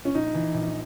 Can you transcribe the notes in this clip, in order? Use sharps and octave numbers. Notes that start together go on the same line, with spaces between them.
C#4
A#1 D#4
E3
A#1